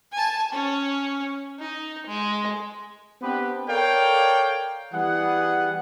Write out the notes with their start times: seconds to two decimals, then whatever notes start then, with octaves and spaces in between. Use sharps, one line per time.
0.13 G#5 A5
0.53 C#4
1.60 D#4
2.07 G#3
3.21 B3 C4 D4 G4 B4
3.67 A4 A#4 C#5 D5 F5 G5
4.93 E3 G3 B3 G#4 F#5